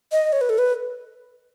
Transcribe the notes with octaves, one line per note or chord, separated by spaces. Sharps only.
D#5
C#5
B4
A4
B4